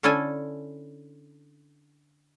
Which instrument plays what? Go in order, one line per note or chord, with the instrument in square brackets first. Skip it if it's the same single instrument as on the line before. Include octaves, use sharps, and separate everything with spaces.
[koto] D3 C#4 D4 E4 A4 G#5